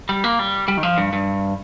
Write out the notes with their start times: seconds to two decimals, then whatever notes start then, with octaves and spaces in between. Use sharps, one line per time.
0.09 G3
0.24 A#3
0.39 G3
0.68 G3
0.77 D#3
0.83 F3
0.98 G2
1.13 G2